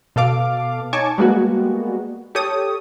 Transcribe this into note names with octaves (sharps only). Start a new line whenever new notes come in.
B2 A4 F5 D6
D#4 C#5 G#5 A5 C#6 D6
G3 G#3 A#3 B3 F#4
G4 A4 C#5 D#6